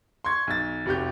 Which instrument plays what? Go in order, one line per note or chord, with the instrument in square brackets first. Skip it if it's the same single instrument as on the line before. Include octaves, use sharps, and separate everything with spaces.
[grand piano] C6 C#6 G#6
B1 A6
F1 F#4 G4 G6